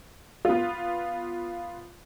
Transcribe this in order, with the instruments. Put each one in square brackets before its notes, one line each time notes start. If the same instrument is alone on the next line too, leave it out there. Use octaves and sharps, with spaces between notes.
[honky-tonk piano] B3 F4